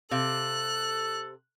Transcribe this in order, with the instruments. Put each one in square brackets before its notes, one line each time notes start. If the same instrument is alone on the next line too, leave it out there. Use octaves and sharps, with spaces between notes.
[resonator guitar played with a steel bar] C3 F5 [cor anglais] A4 [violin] F#6